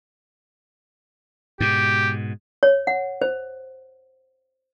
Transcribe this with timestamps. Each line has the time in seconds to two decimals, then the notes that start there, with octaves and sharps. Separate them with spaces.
1.60 G#2 B2 G4
2.63 C#5
2.87 F#5
3.21 C5